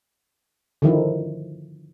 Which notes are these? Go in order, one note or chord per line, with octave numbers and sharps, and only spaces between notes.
D3 D#3 F3 E4